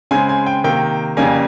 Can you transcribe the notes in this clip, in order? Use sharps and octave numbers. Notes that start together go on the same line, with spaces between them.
C#3 G#3 C4 G#5
G#5
G5
C3 D#3 A#3 G5
F2 C#3 G3 A#3 G#5